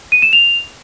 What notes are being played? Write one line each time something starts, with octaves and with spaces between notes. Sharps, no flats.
D#7
E7
F7